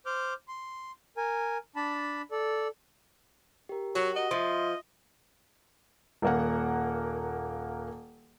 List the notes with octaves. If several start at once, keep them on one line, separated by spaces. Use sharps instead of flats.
C5 D6 F6 G6
C6
A#4 G#5
D4 A5 B5
A4 D5
G4 A#4
F#3 F#4
D#5
F3 F4 E5 C6
D#1 A#3 F#5